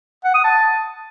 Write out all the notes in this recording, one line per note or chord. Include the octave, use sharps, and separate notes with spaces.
F#5
D#6
A5